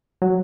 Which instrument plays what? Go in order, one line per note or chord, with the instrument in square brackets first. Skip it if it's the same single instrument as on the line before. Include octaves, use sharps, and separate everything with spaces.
[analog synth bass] F#3